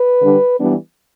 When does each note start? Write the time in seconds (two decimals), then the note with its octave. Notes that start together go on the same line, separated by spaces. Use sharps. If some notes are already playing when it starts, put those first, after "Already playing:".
Already playing: B4
0.21 D3 G3 D4
0.60 E3 G3 B3 D4